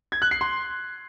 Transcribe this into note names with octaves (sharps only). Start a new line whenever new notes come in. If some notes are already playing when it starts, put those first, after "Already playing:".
G#6
F#6
C7
C6